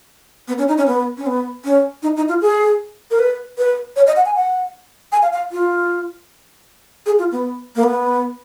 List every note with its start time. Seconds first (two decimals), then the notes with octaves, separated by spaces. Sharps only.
0.48 B3
0.58 C#4
0.68 D#4
0.77 C#4
0.87 B3
1.17 C#4
1.26 B3
1.65 C#4
2.03 D#4
2.17 D#4
2.29 F4
2.41 G#4
3.11 A#4
3.19 B4
3.58 B4
3.96 C#5
4.07 D#5
4.16 F#5
4.25 G#5
4.35 F#5
5.12 G#5
5.22 F5
5.33 F5
5.52 F4
7.06 G#4
7.19 F4
7.32 B3
7.76 A#3
7.84 B3